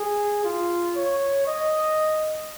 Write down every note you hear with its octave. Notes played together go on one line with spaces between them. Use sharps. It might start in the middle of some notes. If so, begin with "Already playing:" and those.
Already playing: G#4
F4
C#5
D#5